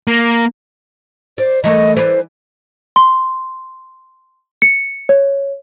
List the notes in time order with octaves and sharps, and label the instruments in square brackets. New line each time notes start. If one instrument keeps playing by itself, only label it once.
[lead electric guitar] A#3
[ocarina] C5 [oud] D5
[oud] E3 A3 A#4 [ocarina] D#5
[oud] E3 B4 D5 [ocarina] C5
[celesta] C6
C#7
C#5